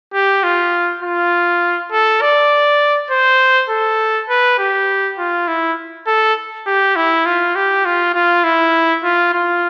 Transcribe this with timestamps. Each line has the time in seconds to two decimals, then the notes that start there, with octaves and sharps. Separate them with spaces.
0.14 G4
0.43 F4
1.03 F4
1.92 A4
2.21 D5
3.10 C5
3.69 A4
4.29 B4
4.59 G4
5.18 F4
5.48 E4
6.07 A4
6.67 G4
6.96 E4
7.26 F4
7.55 G4
7.85 F4
8.14 F4
8.44 E4
9.03 F4
9.33 F4